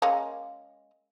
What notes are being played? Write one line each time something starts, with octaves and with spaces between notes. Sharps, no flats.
G#3 A#3 C#4